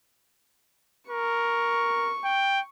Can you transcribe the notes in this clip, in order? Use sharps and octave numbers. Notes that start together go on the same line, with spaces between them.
A#4 C#6
G5